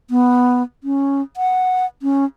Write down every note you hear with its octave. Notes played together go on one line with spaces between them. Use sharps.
B3
C#4
F#5
C#4